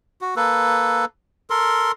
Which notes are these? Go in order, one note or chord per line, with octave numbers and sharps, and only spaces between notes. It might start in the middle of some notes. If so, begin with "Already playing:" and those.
F#4
A#3 A4 B4
A4 A#4 C6